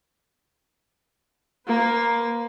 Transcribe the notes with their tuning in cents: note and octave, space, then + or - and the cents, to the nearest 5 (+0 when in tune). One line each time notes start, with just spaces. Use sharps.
A#3 +5 B4 +45